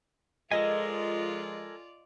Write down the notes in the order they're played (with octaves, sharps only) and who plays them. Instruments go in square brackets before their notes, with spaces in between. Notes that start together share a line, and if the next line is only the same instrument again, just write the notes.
[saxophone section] F3 G#3 [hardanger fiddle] F4 D5 [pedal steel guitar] A4 A#4 G#5 [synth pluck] D#5